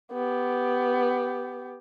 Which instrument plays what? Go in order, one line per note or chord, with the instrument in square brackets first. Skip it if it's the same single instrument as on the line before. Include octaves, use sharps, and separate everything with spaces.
[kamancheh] B3 G4